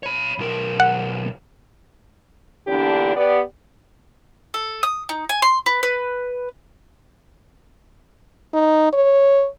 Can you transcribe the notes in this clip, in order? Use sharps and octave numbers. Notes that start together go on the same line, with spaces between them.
C#5 B5
B1 A#4
F#5
A#2 D3 E3 B3 D4 G4
B3 G4 D5
A4
D#6
D#4
G#5
C6
B4
B4
D#4
C#5